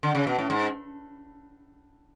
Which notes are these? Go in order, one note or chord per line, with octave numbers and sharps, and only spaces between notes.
D3
C#3
B2
A2
G#2